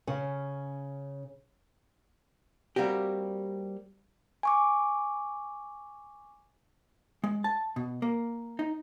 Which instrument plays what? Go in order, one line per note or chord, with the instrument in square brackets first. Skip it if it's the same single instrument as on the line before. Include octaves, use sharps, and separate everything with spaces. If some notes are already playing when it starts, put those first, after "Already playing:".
[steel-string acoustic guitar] C#3 C#4
[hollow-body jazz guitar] G3 A#3 C4 F#4 G4
[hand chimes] G#5 C#6 D6
[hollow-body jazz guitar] G#3
A5
B2
A#3
D#4